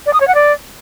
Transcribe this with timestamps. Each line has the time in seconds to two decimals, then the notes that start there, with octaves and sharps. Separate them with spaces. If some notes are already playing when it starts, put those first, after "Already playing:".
0.06 D5
0.13 D#6
0.20 C#5
0.28 F#5
0.35 D5